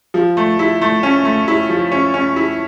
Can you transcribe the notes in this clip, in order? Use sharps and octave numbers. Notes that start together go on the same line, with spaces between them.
F3
A3
E4
A3
C#4
A3
E4
F3
C#4
C#4
E4